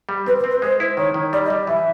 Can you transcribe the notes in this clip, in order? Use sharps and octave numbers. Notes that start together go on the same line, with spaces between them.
G3
C4 B4
B4
C4
B4
G#3 C5
E4
D#3 C#5
D#3
G3 D5
D#5
G3
E3 E5